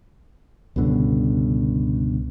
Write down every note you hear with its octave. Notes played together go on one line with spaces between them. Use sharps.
C#2 G2 B2 D3